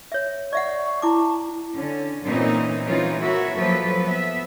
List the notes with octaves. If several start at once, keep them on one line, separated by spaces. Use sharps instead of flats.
C#5 E5
D5 E5 F#5 C#6
E4 A5 D6
D3 C#4
A#2 E3 C4 C#4 D#4
E3 G#3 C4 C#4 D#4 F4
E4 F#4 A#4 C#5 E5
F3 F#3 A#3 A4 B4
B3 E5